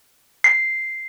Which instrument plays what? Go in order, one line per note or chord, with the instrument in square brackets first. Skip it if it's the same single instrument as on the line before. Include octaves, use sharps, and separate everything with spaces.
[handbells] C7